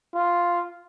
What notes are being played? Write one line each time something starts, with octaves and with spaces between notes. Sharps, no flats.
F4